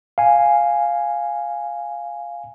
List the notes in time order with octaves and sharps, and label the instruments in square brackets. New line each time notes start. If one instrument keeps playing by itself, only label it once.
[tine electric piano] F5 G#5